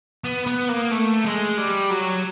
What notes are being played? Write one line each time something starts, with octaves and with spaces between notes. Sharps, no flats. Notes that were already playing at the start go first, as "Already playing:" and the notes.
B3
B3
A#3
A3
G#3
G3
F#3